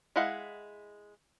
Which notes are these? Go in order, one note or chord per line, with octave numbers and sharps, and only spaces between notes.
G#3 E4 D#5 F5 F#5